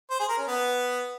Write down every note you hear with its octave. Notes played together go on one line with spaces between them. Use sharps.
C5
G#4
A#4
C#4
B3